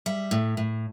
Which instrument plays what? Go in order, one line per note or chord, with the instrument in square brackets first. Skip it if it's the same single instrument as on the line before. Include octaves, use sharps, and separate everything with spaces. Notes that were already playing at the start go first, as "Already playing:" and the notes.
[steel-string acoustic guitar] G3 E5
A2
A2